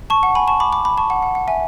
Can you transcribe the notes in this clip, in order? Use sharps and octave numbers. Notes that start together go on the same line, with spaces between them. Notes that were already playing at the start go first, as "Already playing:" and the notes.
A5 C#6
F#5 A5
G#5 B5
A5 C#6
B5 D6
B5 D6
B5 D6
A5 C#6
F#5 A5
F#5
F#5
E5 G#5